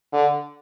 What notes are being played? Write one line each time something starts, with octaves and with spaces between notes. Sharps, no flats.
D3